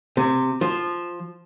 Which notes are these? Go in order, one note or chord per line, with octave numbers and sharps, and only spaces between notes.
C3
F3